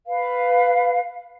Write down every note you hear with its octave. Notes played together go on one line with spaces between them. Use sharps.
B4 F5